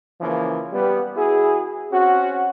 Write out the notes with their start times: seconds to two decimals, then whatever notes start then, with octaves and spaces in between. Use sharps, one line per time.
0.21 C#3 E3 F3 A#3 C#4
0.72 G3 B3
1.16 E4 F#4 G#4
1.92 C4 C#4 F#4